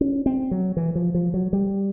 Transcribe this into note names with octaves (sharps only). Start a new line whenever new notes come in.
C#4
C4
F#3
E3
F3
F3
F#3
G3